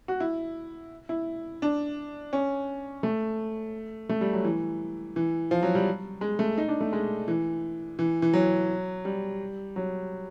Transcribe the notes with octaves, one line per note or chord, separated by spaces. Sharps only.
F#4
E4
E4
D4
C#4
A3
A3
G3
F#3
E3
E3
F3
F#3
G3
G#3
A3
D#4
D4
A3
G#3
E3
E3
E3
F#3
G3
F#3